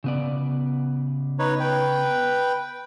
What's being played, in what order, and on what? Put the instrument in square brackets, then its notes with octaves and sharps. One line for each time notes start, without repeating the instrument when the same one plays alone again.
[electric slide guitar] C#3 B3 D5
[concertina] D#4 B4 C#5
B4 G5